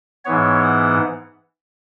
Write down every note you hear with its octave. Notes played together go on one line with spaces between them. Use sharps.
G#2 E3 B3 C#5
F#5